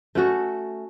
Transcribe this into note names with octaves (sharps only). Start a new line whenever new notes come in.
A3 C#4 F#4 A4